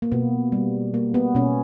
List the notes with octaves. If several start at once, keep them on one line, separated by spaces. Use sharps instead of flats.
A#3
B2 B3
G3
A#3
B3
B2 C#4